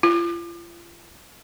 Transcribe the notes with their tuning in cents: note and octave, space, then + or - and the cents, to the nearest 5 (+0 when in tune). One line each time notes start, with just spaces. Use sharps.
F4 -35